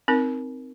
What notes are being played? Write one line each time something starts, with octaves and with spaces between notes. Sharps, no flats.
C4 D#4 A#4